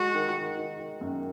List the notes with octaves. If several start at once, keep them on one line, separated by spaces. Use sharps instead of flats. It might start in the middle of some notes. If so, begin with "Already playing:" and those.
Already playing: G#3 F#4
D#3
D#3
D#3
D#3
F#2